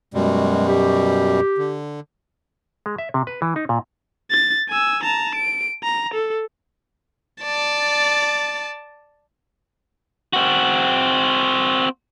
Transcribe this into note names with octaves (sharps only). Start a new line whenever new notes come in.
F#2 B2 G3 G#3
G4
D3
G#3
E5
C3
B4
E3
D#4
A#2
A6
G#5 E6
A5 A#5
D7
A#5
A4
D5 A5
C4 F#4